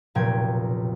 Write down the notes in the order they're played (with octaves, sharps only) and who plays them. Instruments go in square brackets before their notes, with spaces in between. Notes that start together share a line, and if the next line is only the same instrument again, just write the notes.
[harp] F1 B1 A#2 G5 G#6